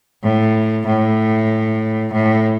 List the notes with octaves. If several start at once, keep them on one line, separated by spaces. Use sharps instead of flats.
A2
A2
A2